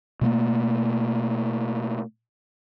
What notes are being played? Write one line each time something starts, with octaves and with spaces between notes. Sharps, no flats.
B2 A3 A#3